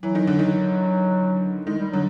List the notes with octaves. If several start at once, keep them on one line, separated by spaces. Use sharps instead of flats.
E3 F#3
D#3
D3
D#3
D#3 G#3
G3
D3 F#3